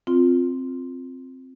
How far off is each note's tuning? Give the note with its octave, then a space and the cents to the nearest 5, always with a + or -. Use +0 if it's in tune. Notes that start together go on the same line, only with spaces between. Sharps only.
C4 +0 F4 +10